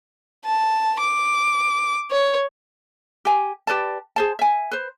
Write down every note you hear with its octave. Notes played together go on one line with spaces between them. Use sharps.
A5
D6
C#5
G4 G#5
G4 B4 D5 A5
G#4 C5 A5
E5 G#5
B4 C5